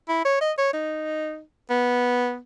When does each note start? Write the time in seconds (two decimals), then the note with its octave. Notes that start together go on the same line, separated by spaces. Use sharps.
0.09 E4
0.25 C#5
0.41 D#5
0.58 C#5
0.74 D#4
1.70 B3